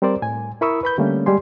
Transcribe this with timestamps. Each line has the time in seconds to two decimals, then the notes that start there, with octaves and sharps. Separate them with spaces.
0.02 G3 C4 A#4 C5 D5
0.22 A2 G#5
0.61 E4 A#4 B5 C#6 D#6 E6
0.83 B4 B5 G6
0.98 D3 G3 A3 A#3 C#4
1.26 G3 G#3 G4 G#5 C6